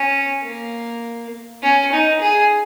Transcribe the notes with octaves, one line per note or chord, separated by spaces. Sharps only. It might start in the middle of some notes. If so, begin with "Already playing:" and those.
Already playing: C#4
A#3
C#4
D#4
G#4